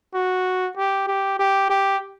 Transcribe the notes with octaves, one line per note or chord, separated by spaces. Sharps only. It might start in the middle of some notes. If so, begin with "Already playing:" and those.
F#4
G4
G4
G4
G4